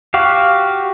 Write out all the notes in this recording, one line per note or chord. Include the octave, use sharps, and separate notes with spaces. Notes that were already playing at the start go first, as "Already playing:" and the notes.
F#4 G4 F5